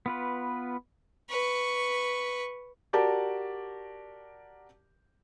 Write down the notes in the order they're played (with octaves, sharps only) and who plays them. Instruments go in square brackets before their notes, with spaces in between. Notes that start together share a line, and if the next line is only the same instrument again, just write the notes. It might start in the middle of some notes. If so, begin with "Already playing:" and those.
[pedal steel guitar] B3 F4 B4
[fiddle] B4 C#6
[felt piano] F#4 G4 A#4 D5 A5